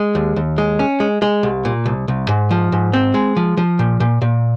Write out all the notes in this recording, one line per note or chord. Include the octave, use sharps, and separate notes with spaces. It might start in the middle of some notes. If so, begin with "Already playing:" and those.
Already playing: G#3
D#2
D#2
G#3
C#4
G#3
G#3
C2
A#2
C2
C2
G#2
F3
G#2
C4
G#3
F3
F3
A#2
A#2
A#2